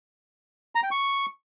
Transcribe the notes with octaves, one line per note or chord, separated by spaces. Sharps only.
A#5
G5
C#6